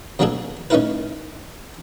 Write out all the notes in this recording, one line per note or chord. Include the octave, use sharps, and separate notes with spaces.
B2 F#3 A#3 D4 G#4 A4
A3 C#4 D#4 E4 A#4 B4